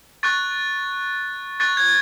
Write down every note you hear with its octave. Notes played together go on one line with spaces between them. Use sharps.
C#6 F#6 A6
C#6 F#6 A6
G#6